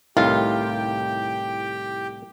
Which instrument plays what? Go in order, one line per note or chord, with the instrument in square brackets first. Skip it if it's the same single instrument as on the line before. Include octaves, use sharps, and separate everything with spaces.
[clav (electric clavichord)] C2 A2 D#3 [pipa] F4 [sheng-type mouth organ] G4 G5